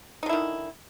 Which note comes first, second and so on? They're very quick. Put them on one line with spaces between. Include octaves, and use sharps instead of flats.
D#4 D3 E4 D#3